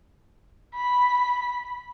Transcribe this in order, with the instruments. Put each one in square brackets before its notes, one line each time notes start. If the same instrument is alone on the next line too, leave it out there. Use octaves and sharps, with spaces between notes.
[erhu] B5